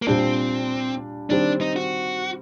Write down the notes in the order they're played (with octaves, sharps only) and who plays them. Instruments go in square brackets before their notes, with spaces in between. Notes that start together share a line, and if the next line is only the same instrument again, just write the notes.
[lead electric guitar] A#3
[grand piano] A#2 G3 D4 [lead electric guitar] C4
[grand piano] D#3 G3 C4 [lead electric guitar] D4
[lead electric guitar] D#4
F#4